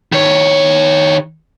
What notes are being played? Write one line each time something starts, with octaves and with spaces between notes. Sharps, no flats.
D#3 C#5